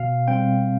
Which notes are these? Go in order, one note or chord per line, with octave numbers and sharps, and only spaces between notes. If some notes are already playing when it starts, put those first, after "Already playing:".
Already playing: B2 F5
G3 C4 G5